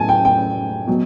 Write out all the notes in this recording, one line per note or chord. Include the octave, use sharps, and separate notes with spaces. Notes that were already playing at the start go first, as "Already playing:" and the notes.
Already playing: A2 F#3 G#5 A5
G5
G5
B2 F#3